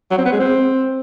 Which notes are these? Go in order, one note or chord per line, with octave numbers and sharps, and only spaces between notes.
F#3
C4
B3
G#3
C4